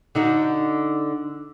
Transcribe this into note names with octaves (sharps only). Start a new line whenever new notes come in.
D3 D#4 F#4